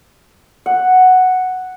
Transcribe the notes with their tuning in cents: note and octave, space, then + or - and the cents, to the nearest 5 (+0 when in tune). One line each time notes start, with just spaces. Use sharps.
F#5 +0